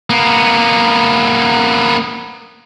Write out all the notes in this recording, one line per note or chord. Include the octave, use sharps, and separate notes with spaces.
A#3 B3